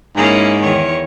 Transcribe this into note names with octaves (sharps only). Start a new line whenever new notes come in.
G#2 A#3 C#4 E4
E2 D#3 C#5